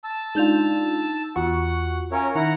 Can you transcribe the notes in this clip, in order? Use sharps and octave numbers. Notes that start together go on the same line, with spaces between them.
A5 E6
G#3 D4 D#4 F4 G6 F7
E2 F4 F#4 F#5 C#6
C#4 A#4 C#5 E5 F5 G#5
D#3 E4 F#5 A#5